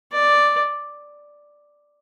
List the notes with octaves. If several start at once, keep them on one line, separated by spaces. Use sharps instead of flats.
D5